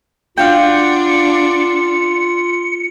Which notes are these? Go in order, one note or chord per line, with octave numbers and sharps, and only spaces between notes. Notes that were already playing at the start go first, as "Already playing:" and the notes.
D4 F4 F#4 F5 G5 C#7